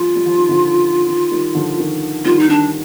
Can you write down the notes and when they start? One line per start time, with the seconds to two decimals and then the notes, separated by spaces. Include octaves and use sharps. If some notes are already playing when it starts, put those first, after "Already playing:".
Already playing: F3 G3 G#3 F4
0.15 G3
0.26 F3
0.38 D#3
0.49 D3 F3
1.08 D#3
1.31 D#3 G3
1.55 D3 F3
1.79 D#3
2.25 D#3 G3 F4
2.39 D#4
2.48 D#3 D4